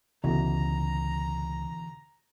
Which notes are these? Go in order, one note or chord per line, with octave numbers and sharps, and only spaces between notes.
C#2 B2 D3 E3 A#5